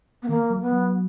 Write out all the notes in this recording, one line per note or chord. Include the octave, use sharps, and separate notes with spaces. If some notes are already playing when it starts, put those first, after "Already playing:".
B3
D#3 A#3
F#3
B3
F#3